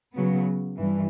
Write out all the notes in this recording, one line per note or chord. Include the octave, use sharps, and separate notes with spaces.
C#3 F#3 B3
G2 E3